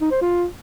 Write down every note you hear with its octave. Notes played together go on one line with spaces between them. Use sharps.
D#4
C5
F4